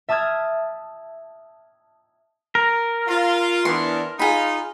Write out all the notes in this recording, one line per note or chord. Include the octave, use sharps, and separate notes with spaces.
E5 A5 D#6 F6 G#6
A#4
F4
E3 B3 D4 C6
D#4 F4 G#4 B5